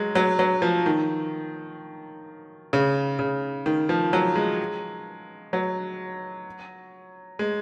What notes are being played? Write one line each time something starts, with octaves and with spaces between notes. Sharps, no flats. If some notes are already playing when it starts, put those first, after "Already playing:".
Already playing: F#3 G#3
F#3
F#3
F3
D#3
C#3
C#3
D#3
F3
F#3
G#3
F#3
G#3